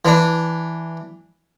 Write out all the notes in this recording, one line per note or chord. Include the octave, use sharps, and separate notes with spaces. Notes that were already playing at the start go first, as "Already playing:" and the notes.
E3 D4